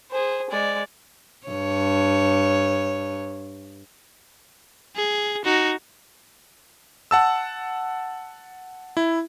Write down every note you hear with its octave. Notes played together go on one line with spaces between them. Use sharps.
G#4 C5
G#3 D5
G2 C#5
G#4
D#4 F#4
F#5 A5 E6
E4